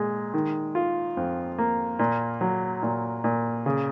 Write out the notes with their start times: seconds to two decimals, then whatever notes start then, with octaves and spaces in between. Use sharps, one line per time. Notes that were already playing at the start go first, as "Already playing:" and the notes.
Already playing: A#2 G#3
0.34 D#3
0.75 F4
1.17 F2
1.58 A#3
1.99 A#2
2.41 F#3
2.83 A#2
3.24 A#2
3.66 C#3